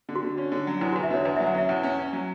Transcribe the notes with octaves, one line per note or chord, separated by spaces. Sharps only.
D3
F#4
D3
C#4
D3
F#3
E2 E4
E2 F#4
E5
D3 C#5
E2 D5
F#3 E5
F#5
C#4 E5
E2
C#4
C#4
F#3